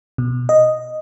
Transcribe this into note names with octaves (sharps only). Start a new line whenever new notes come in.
B2
D#5